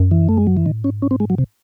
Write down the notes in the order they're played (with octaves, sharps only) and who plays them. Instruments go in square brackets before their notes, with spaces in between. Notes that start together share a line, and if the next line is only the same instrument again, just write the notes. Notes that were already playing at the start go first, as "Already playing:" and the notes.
Already playing: [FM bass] F#2
[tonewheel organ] E3
A3
G#3
F#3
E3
[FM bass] A2 [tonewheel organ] D#3
[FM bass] G#2 [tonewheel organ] C#4
[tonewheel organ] C#4
C4
G#3
F#3
C3